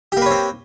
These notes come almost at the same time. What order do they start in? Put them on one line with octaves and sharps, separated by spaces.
G4 A#3 B4 C#5 C4